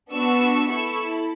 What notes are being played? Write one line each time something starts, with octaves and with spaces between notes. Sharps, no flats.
B3 D4 F#4 C#6 E6
E4 A4 C#6 E6